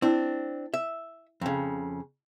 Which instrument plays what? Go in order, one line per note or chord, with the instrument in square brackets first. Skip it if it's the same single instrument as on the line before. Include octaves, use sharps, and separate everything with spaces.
[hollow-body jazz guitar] C4 D4 [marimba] E4
[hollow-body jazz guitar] E5
F2 C#3